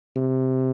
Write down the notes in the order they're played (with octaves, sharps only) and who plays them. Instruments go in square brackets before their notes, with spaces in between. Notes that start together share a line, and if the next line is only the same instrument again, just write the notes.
[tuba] C3